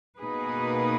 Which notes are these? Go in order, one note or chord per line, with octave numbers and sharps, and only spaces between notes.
B2 A#3 D#4 G#4 B4